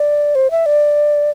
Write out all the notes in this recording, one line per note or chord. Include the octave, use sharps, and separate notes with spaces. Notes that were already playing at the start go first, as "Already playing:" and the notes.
Already playing: D5
C5
E5
D5